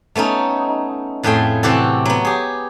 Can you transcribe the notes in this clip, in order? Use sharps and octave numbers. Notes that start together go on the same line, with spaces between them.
A3 B3 C#4 D#4
F2 A2 A3 G#4 G5
C3 E3 F#4 G4 A4
F#3 B3
G4 G#4